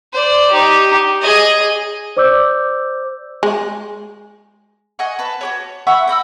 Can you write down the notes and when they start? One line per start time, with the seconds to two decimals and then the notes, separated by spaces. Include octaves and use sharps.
0.13 C5 D5
0.51 D#4 G4
1.21 G#4 D#5
2.17 C5 D5 D6 E6 G6
3.43 G#3
4.99 D#5 F#5 G#5 C#6
5.19 B4 A5
5.41 F#4 G4 C#5
5.87 E5 F#5 B5 C#6
6.08 G5 A#5 B5 E6